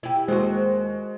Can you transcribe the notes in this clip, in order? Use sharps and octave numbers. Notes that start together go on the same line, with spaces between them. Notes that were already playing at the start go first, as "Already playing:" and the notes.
E4 G4
D#2 B2 G#3 F#4 C5